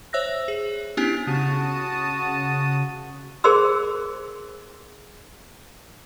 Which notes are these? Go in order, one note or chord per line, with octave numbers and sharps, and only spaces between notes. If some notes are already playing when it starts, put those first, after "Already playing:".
C5 C#5 E5 E6 F#6 A#6
G#4
B3 C#4 D4 E4 G4 G#5
C#3 F#4 A5 D#6
G#4 A#4 C5 D5 C6 E6